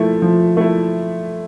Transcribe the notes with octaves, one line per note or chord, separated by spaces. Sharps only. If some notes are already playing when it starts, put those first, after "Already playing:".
Already playing: F3 A3 E4
F3
A3 E4